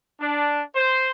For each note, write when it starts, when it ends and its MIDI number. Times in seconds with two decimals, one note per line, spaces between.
0.20 0.62 62
0.75 1.10 72